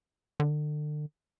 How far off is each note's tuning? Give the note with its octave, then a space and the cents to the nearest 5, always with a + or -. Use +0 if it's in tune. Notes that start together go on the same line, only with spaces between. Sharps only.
D3 +35